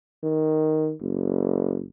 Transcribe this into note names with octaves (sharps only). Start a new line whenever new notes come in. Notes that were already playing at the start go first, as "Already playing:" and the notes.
D#3
F#1